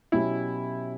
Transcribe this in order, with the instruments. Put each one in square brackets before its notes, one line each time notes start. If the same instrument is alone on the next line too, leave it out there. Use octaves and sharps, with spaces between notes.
[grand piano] B2 F#3 C#4 G4 [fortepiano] E4